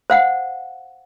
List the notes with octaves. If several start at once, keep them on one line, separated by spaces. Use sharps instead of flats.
C5 F5 F#5